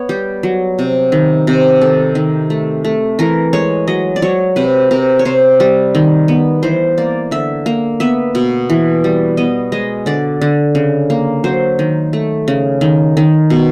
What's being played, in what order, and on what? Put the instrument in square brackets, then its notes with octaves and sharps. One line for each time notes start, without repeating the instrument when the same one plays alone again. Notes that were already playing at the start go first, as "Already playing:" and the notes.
Already playing: [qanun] B3 C#5
G3 G4
F#3
C3
D#3
C3
D#3 A4
D#3
A3
A3
E3 A#4
G#3 C#5
F#3 D#5
D5
F#3 C#5
C3 B4
C3 A#4
C#5
C3 C5
G3
D#3
B3
E3 C5
A#3 D5
D3 E5
A#3
B3 E5
B2
E3
G3
B3 D#5
G#3 D#5
D3 D5
D3
C#3
A#3
F#3 C5
D#3
A3
C#3
D#3
D#3
B2